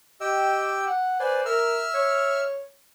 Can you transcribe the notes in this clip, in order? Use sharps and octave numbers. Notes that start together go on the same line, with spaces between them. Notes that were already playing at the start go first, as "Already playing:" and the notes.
G4 D#5 G5 E6
F#5
B4 C5 D5 G#5
A#4 E5 E6 F6
C#5